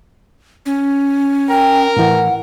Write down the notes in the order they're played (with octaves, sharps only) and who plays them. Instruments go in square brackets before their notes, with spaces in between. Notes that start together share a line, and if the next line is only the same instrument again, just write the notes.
[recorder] C#4
[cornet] A#4 [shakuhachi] G5
[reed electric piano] A2 E3 [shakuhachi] F#5